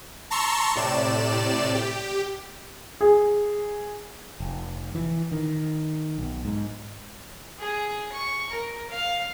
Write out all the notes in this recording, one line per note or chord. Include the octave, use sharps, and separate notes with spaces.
A5 A#5 C6 C#6 E6
A2 C3 D5 E7
G4
G#4
F1
E3
D#3
B1
G#2
G#4
C#6
A#4
F5